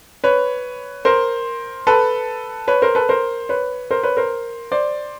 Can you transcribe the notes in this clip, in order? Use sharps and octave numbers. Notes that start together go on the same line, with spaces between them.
B4 C#5
A#4 C5
A4 B4
B4 C#5
A#4 C5
A4 B4
A#4 C5
B4 C#5
A#4 C5
B4 C#5
A#4 C5
C5 D5